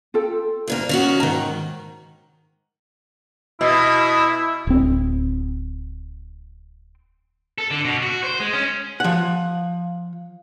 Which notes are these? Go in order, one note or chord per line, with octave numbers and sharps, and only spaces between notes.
F4 A4 G5
D2 G#2 A#3
D#3 C#4 F#4
G#2 D#3 A#5
B2 E4
D1 C4
A4
D3
B2
F#4
C5
G#3
C#4
F3 F#5